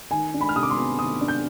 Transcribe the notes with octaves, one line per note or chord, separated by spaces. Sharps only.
D#3 G#5
D4
B5
F6
C3 D#6
D6
C6
B3
D#3 D#6
D4
G6